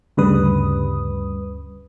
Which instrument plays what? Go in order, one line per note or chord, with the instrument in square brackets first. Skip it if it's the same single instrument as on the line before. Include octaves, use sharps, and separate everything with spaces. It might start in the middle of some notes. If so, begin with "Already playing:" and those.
[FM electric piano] D2 G2 C#3 G3 B4 D#6